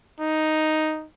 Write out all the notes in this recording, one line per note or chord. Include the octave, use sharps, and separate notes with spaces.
D#4